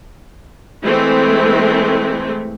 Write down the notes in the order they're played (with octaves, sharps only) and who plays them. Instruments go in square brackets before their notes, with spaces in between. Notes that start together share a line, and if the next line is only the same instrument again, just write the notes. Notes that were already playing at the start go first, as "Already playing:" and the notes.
[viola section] E3 G#3 A3 C4